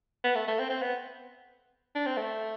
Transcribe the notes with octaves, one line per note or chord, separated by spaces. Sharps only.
B3
A3
A3
C4
C4
B3
D4
C4
A3